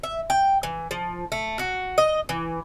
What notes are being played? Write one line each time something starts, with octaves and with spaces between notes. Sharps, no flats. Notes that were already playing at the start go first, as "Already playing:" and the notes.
E5
G5
E3
F3
A3
F#4
D#5
E3